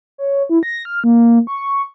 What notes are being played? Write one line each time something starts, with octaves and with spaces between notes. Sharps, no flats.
C#5
E4
A#6
F6
A#3
C#6